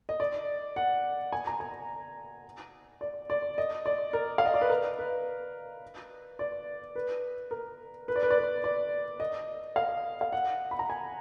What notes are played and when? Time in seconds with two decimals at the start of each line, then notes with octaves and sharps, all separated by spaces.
0.09 D#5
0.20 D5
0.76 F#5
1.32 G#5
1.47 A#5
1.60 G#5
3.01 D5
3.30 D5
3.58 D#5
3.86 D5
4.13 A#4
4.38 F5
4.46 D#5
4.54 D5
4.61 B4
4.70 A#4
4.99 B4
6.39 D5
6.96 B4
7.51 A#4
8.08 B4
8.16 D5
8.23 B4
8.30 D5
8.38 B4
8.64 D5
9.20 D#5
9.76 F5
10.21 F5
10.32 F#5
10.71 B5
10.79 A#5
10.90 G#5